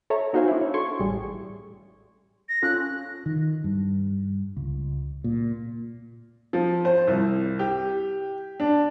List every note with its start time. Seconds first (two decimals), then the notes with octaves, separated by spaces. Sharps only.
0.10 A4 C#5 E5 A#5
0.33 B3 D#4 F#4 C5 F5 G#5
0.48 D4 E4
0.61 C#5
0.74 A4 C6 C#6 G#6
1.00 A1 G3 G#4
2.48 A#6
2.62 C#4 F4 A4 F#6
3.26 D#3
3.64 G2
4.57 C#2
5.24 A#2
6.53 F3
6.85 C5
7.08 C2
7.59 G4
8.60 D4